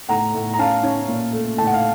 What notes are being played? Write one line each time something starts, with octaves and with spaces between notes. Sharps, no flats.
A2 F#5 A#5
A2
A#5
C#4 F5 A5
C#4
A#2
A3
A2 A5
F#5
F5